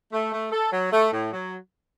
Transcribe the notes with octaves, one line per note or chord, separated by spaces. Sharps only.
A3
A3
A4
F#3
A3
A2
F#3